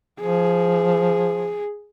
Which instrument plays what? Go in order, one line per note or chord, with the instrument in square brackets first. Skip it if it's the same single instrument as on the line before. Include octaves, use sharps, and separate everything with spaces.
[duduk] F3 [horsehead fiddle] G#4